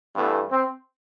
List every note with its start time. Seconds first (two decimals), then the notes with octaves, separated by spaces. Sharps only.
0.16 G2 E3 A3 B3
0.51 C4